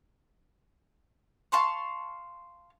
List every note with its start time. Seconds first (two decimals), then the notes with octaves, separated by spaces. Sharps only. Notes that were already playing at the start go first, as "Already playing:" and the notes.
1.52 F5 A5 C6 C#6